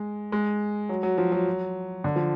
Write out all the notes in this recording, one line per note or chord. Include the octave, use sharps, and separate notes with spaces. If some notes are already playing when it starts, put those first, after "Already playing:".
Already playing: G#3
G#3
F#3
F#3
F3
F#3
D3
F3